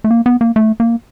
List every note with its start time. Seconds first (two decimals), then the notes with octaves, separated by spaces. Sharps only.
0.04 A3
0.11 A#3
0.26 B3
0.41 A#3
0.56 A3
0.80 A#3